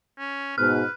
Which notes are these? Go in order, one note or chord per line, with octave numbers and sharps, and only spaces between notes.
C#4
G#2 B2 B4 F6